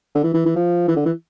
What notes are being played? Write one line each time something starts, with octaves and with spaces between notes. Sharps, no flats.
D3
E3
E3
E3
F3
E3
D3
E3